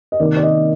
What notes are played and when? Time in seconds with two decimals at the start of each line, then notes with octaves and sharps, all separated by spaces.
0.12 D#5
0.20 C3 D#3 A#3 D5
0.37 D5
0.43 D#5